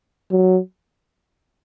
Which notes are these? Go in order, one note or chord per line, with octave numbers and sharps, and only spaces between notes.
F#3